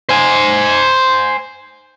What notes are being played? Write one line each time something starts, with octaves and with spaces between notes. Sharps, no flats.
C5 G#5